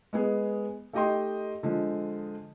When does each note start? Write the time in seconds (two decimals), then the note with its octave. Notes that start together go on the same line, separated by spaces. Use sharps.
0.13 G#3 B3 G#4
0.93 A3 D#4 G4 D#5 G5 C6
1.63 D3 F3 G#3